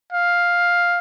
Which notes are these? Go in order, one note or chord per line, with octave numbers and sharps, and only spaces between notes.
F5